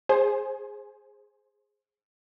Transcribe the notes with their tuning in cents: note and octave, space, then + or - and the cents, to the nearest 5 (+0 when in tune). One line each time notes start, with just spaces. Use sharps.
G#4 +0 C5 +25 G#5 +25